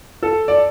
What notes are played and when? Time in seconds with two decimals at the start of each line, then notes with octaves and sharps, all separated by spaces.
0.23 A4
0.48 D5